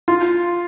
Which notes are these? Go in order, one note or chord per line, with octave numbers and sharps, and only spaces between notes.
F4